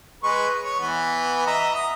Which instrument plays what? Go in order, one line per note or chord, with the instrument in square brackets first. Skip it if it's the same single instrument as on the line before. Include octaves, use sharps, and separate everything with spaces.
[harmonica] G#3 B4 C#6
C#5
E3 B3
D#5 E5 A#5
D#6